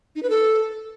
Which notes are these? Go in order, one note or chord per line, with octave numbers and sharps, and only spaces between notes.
D#4
B4
A4